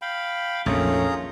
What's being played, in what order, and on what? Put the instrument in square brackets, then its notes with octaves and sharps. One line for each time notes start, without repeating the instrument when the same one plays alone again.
[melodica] F5 G5 B5
[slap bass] A#1 F2 [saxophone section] D#3 A3 C#4 [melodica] F4 G#4 A#5